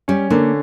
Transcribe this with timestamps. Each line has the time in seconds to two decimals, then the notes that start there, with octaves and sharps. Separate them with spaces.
0.08 G3 C#4
0.30 D3 A#3